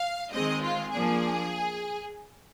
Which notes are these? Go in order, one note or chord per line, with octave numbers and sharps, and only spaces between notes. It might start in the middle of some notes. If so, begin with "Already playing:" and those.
Already playing: F5
D#3 G#3 C4 D#5
F4
F3 A#3 D4 G#4